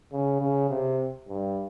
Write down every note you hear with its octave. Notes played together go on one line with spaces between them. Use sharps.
C#3
C#3
C3
G2